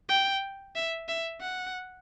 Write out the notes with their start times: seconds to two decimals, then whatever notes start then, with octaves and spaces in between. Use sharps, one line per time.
0.09 G5
0.76 E5
1.09 E5
1.41 F#5